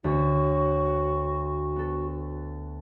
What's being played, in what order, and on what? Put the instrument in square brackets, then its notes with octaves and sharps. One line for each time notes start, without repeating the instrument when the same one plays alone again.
[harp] D2 C#5 [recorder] F#4
[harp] B3 A4